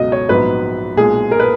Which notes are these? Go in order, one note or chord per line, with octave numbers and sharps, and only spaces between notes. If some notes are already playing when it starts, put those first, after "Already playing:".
Already playing: C#2 B2 F#3 C#4 D#5
C#5
A#1 G#2 F#3 B3 B4
B1 A#2 G#3 G#4
A#4
B4